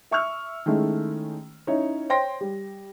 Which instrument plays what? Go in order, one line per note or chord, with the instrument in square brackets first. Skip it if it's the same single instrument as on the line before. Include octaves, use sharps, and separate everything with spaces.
[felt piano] E5 C#6 E6 F6
D#3 G#3 A3 C#4 E4
C#4 D#4 E4 C#5
C5 C#5 G5 C6 A#6
G3